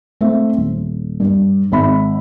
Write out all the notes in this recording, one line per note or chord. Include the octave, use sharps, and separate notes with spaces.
A3 C4 E5
D#1
G2
G#1 E5 B5